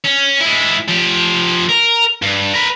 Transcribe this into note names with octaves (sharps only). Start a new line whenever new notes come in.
C#4
G#3 E4
F3 G4
A#4
G2
A#4 B4